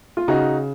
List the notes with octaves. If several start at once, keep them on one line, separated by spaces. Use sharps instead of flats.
F4
C#3 D#4 F#4